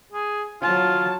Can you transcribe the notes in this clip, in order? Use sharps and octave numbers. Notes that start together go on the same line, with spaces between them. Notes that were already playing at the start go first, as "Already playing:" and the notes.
G#4
F#3 F4 A5